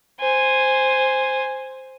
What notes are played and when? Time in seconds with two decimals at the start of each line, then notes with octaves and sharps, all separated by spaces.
0.20 C5 G#5